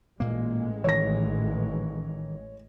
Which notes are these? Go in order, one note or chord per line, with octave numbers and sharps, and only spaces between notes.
A1 A#2 G#3 A#3
D#3 E3 C#5 A#6